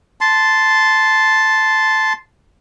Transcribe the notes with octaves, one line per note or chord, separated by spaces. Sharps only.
A5 C6